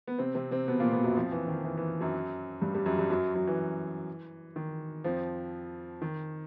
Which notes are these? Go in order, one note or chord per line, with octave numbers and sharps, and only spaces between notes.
B3
C3 C4
C3 C4
C3 C4
B2 B3
A#2 A#3
B2 B3
F#2 F#3
F2 F3
E3
D#3
E3
E3
F#2 F#3
G2 G3
G2 G3
F#2 F#3
G2 G3
F#2 F#3
F#2 F#3
E3
D#3
F2 F3
D#3